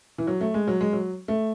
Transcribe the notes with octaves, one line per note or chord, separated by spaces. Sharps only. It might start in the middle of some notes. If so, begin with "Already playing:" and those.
E3
F#3
A3
G#3
F#3
G#3
F#3
A3